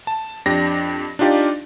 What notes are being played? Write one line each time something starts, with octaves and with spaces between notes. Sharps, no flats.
A5
F2 D4 G4 A#6
D4 D#4 F4 G4 D5